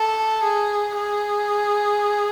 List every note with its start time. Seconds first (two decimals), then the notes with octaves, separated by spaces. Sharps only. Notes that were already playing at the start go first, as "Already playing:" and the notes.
Already playing: A4
0.43 G#4
0.97 G#4